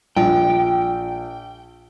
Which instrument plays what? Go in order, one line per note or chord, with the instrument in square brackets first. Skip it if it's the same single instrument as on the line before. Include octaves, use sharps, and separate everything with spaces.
[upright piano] A#1 [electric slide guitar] G5